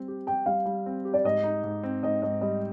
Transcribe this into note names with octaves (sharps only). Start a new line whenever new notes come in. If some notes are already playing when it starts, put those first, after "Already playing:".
Already playing: G3 C4
G4
G4 G5
G3 F5
G3
C4
G4
D5
G#2 D#5
D#4
G#2
C4
G#2 D#5
G#2 D#5
G3 D#5